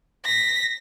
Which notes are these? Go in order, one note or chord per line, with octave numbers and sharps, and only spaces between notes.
A#6 B6